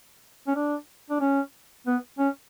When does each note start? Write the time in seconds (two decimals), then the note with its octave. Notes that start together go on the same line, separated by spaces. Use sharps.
0.48 C#4
0.56 D4
1.10 D4
1.21 C#4
1.87 B3
2.19 C#4